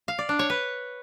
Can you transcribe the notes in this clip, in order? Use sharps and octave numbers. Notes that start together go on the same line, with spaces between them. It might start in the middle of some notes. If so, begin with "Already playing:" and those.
F5
D5
D4
C#5
B4